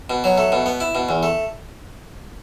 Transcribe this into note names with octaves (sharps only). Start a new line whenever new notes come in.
B2
F#3
A3
B2
B3
E4
B2
E2
A3